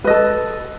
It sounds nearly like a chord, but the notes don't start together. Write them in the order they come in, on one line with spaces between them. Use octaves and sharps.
B4 D#5 A4